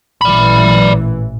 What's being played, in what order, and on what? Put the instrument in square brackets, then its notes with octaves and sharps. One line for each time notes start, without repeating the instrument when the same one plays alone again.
[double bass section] A1 A#2 E3 [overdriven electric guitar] D5 B5